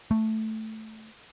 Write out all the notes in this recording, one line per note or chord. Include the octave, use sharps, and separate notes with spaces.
A3